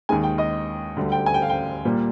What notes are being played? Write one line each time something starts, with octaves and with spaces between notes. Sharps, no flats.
D#2 D#3 G#3 G#5
G5
D#5
D2 D3 G3
G5
G#5
G5
F5
G5
A#2 G3 A#3